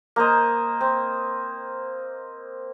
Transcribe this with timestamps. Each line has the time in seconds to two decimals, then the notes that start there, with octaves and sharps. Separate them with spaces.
0.16 A#3 C5 D#5
0.81 C4